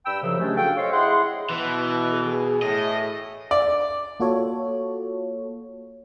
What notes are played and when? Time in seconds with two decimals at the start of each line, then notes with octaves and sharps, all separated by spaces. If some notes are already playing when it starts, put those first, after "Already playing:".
0.05 G2 G5 B5 E6
0.22 F#2 C#3 F3 F#3
0.39 G#3 A3 C#4 D4 G4 G#4
0.57 F#4 A4 F5 G5
0.77 C5 C#5 D#5 F5 C#6
0.93 E4 G#4 D#5 F#5 C6
1.50 B2 E3
2.13 G#4
2.62 A2 D#5
3.51 D5
4.20 A#3 F4 F#4 A4 C#5